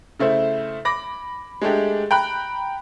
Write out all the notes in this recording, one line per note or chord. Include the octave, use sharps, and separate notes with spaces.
C#3 A3 E4 C5
B5 D6 A#6
G#3 A3 D4 G4
G5 A#5 B5 F#6